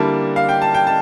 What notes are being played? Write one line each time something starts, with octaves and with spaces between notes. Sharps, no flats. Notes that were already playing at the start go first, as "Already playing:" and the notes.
Already playing: D3 G3 A#3 E4 A5
F5
G5
A5
G5
A5